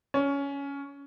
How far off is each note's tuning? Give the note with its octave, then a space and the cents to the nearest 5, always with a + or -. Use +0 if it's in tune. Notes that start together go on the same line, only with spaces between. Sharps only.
C#4 +15